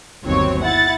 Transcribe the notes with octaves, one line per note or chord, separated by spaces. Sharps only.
G1 D#2 F#3 C4 C#5
E4 F#5 A6